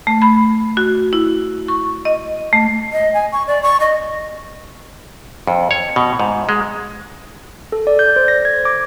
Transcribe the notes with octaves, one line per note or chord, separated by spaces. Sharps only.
A3
B5
F#4
E4
C#6
D#5
A3
D#5
G#5
C#6
D5
C#6
D#5
F2
C#5
B2
G#2
G#3
A4
D5
G6
C5
A#6
G#6
D6